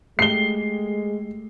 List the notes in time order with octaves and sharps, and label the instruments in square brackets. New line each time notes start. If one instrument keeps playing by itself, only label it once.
[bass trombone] G#3 [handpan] A3 G4 [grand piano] C7 G7